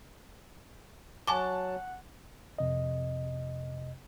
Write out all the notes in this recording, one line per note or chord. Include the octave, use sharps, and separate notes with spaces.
F#3 F#5 G#5 A5 C#6 D6
F2 C3 D#5